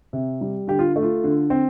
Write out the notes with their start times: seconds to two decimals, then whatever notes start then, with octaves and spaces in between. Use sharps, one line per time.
0.13 C3
0.41 G3
0.68 D3 G4
0.79 F4
0.96 A3
1.02 F4
1.24 D3
1.50 C4